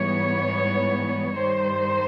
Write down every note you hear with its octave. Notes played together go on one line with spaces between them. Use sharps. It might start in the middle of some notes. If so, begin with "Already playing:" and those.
Already playing: G#2 E3 G3 B3 C#5
G2 D#3 G3 C5